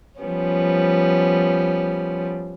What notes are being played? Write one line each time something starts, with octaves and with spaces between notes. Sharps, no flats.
F3 G3 B3 C#4